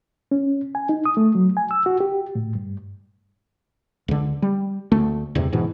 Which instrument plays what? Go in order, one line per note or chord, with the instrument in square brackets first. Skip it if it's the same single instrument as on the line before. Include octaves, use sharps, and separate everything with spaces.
[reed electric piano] C#4
G#5
D#4
D#6
A3
F#3
G#5
E6
F#4
G4
A2
G2
[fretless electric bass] C#2 D3
G3
D2 A3
E2 G2 C3
G#2 B2 E3